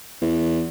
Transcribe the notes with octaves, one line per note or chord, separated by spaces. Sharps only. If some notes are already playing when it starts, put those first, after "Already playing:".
E2